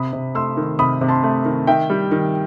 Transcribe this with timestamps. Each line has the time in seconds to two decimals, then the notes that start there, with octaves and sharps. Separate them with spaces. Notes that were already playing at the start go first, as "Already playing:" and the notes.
Already playing: C3 B5 D#6
0.13 C3
0.35 A3 C6 E6
0.57 D#3
0.79 C3 B5 D#6
1.01 C3
1.09 A5 C6
1.23 A3
1.45 D#3
1.67 D#3 E5 G5
1.90 G3
2.11 D#3